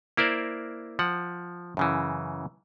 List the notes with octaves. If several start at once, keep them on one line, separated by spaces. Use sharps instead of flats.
A#3 E4 A#4 C5 D5
F3 F#5
F#2 C#3 E3